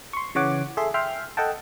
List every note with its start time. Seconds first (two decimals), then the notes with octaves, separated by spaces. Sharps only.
0.13 C6 C#6
0.35 C#3 E3 C#5 F#5 D6
0.77 G#4 A4 E5 C6
0.94 E5 G5 C6 F6
1.37 A4 D#5 F#5 G5 A5